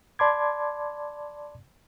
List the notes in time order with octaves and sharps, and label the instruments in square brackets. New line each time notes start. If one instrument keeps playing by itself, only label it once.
[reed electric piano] D5 A5 B5 C6 D6 G#6